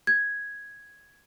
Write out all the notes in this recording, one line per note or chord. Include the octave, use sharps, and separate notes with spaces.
G#6